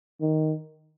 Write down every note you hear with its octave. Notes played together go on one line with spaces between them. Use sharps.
D#3